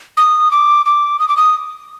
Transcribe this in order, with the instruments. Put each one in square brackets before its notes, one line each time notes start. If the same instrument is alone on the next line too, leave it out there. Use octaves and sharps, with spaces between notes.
[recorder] D#6
D6
D6
D#6
D6
D#6